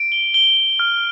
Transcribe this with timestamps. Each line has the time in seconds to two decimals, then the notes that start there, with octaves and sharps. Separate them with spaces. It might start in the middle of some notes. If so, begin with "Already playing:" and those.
Already playing: D7
0.12 G7
0.34 G7
0.57 G7
0.79 F6